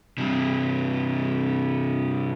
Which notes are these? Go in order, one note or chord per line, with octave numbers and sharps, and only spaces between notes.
G2 C3